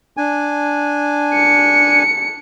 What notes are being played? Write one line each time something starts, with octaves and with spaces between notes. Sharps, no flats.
D4 G#5
C#7